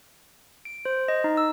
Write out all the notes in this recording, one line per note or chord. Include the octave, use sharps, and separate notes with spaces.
D7
C5
D#5
D#4
E6